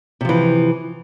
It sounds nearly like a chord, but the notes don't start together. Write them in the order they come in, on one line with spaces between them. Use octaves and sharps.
C3 F3 E3